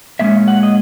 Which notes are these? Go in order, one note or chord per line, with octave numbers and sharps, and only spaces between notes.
A#2 G#3 C#4 E5
F#5
D#5